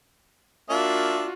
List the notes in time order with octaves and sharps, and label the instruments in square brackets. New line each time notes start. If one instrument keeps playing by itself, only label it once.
[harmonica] A#3 D4 E5 [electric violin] F4 F#4